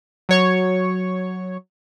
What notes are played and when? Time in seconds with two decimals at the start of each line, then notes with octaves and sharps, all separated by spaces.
0.29 F#3 C#5 C#6